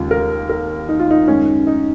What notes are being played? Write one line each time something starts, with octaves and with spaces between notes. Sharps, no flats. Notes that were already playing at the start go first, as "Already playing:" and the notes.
Already playing: D#2 C#3 G#3 F4
A#4
A#4
D#4
F4
D#4
F#2 D#3 G#3 C#4
D#4